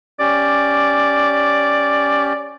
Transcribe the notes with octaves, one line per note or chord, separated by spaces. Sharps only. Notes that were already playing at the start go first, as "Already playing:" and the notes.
C#4 G4 D5